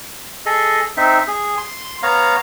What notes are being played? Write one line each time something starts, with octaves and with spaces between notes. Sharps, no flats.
G#4 A4 D#5
C4 D#4 E5
G#4
C6
B3 C#5 F5 A#5